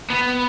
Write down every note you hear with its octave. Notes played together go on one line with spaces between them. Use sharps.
B3